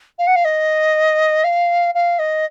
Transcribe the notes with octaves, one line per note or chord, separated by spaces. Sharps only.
F5
F#5
F5
D#5
F5
F5
D#5